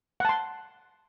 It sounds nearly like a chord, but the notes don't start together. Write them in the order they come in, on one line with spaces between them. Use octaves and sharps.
F#5 A5 C6